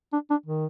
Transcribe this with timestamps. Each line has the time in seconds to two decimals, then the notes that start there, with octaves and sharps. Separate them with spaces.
0.13 D4
0.30 D4
0.46 D#3